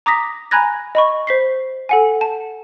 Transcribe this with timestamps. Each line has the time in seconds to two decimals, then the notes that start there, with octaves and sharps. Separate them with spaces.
0.06 A#5 D6 D#6 A#6 B6
0.51 G#5 A#5 B5 F#6 G#6 A#6
0.95 D#5 B5 C#6
1.27 C5 B6 C7
1.89 A4 F#5 G#5
2.21 A5